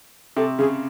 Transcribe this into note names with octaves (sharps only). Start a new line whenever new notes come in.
C3 A4
C#3 G#4